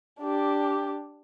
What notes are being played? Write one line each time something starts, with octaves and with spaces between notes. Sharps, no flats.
D4 G4